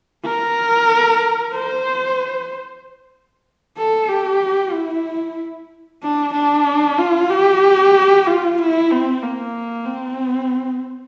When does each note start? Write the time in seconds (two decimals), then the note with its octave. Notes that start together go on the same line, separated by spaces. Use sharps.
0.25 A#4
1.54 C5
3.78 A4
4.09 G4
4.73 E4
6.03 D4
6.34 D4
6.98 F4
7.30 G4
8.27 F4
8.58 E4
8.91 C4
9.23 A#3
9.86 C4